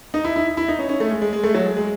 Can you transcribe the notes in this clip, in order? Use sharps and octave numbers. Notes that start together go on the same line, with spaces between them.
D#4
E4
E4
E4
D#4
C#4
C#4
A3
G#3
G#3
G#3
A3
F#3
G#3
G#3